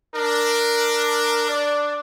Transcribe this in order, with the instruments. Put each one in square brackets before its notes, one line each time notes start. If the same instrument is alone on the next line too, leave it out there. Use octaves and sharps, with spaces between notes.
[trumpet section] D4 [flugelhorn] A#4
[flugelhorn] D5